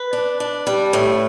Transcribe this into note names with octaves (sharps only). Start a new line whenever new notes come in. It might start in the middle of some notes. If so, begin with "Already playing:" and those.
Already playing: B4
D4
D4
G3
A2